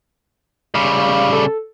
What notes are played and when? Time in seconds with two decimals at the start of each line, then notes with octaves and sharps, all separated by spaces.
0.75 C#3 G3 F5
1.33 A4